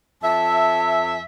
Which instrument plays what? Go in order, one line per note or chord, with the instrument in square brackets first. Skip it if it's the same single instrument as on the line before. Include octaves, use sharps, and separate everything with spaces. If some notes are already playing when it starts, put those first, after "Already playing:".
[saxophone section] F2 E5 [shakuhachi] A5